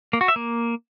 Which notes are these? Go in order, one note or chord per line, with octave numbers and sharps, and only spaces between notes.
A#3
F#4
E5
A#3